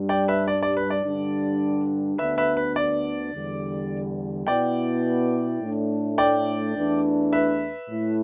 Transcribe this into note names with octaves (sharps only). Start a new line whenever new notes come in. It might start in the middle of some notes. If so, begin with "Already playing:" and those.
Already playing: G2 G3 D4
D5 G5
B4 E5
D5
D5
B4
D5
G2 D3 G3 D4
D2 D3 B3 D4 B4 E5
B4 E5
B4
D5
E2 D3 G3
B2 B3 E4 D5 G5
A2 A3 D4
D5 G5
E2 E3 A3 D4
B4 E5
A2 A3 E4